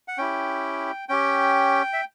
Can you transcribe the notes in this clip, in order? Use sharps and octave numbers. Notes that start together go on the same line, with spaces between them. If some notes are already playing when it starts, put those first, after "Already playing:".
F#5
C#4 E4 G4 G5
C#4 G4 G5
E5